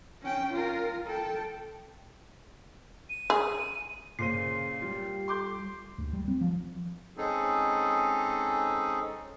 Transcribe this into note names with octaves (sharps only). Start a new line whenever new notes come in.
C#4 G5
F4 A#4
A4 G5
D#7
G#4
A#2 C#3 C5 C7 D#7
G3 F4 G4
C6 D6 G6
D2
G3
C4
F3
G#3 C4 C#4 D#4 G#4 A4